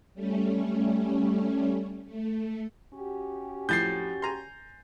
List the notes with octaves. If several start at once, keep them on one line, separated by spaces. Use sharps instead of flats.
G3 A3 C#4
A3
C#4 F#4 G4
F2 A2 G6 A6 C7
G#5 A#5 C6